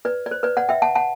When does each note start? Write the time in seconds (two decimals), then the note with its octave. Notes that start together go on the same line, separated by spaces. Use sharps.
0.05 B4 D5
0.26 D5
0.31 C5
0.43 B4 D5
0.57 D5 F#5
0.69 E5 G5
0.82 F#5 A5
0.95 F#5 A5